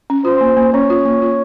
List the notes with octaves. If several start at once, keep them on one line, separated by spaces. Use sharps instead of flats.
C#4
F4 C5
A#3
A#3
C#4 C#5
F4
A#3
F4